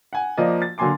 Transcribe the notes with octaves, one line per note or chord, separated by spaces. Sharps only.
F#5 G#5
F3 A#3 D5 D#5
A6
D3 F#3 A#3 G#5 C6 D6